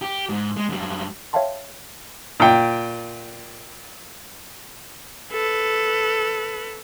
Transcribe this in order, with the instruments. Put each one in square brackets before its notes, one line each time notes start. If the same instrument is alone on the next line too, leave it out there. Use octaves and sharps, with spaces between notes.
[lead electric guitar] G4
G#2
G#3
F#2 G3
[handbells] C#5 E5 F5 G5 A5 C6
[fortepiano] A#2 G5
[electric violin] A4 B4